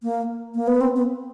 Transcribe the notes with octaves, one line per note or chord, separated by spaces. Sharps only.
A#3
A#3
B3
C4
B3